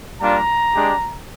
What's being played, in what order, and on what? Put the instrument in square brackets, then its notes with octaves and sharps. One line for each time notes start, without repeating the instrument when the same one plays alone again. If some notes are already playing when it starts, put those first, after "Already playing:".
[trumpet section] G3 A#3 D4 F4 A#5
G#3 D4 G4